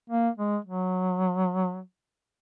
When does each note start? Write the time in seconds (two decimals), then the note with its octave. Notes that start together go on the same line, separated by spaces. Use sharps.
0.10 A#3
0.38 G#3
0.65 F#3